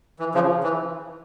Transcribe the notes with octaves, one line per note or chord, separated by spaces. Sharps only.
E3
C#3 F3
E3